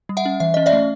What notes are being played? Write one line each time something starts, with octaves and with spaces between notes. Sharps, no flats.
G3
E5 F#5
C#4
E3 E5
C#4 D#5
D5 E5
A3